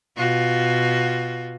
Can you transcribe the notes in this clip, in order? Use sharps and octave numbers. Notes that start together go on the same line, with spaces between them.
B2 F4 F#4